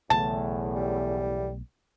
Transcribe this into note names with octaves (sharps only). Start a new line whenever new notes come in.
B1 E2 A2 C#3 A3 A5
G3